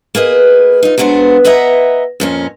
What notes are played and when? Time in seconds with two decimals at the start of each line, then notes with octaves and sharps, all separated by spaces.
0.15 A#3 G#4 B4 D#5
0.83 D#4 F4
0.98 F#3 G#3 B3 D4 C5
1.45 B4 D#5 E5 F#5 A#5
2.20 F2 A#2 C#4